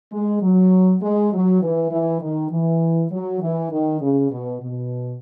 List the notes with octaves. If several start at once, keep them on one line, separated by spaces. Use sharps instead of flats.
G#3
F#3
G#3
F#3
E3
E3
D#3
E3
F#3
E3
D#3
C#3
B2
B2